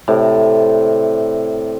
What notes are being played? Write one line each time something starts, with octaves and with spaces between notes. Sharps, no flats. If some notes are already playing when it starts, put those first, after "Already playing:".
A2 C3 D5